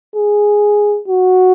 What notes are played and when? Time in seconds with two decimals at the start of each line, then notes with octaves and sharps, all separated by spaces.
0.16 G#4
1.08 F#4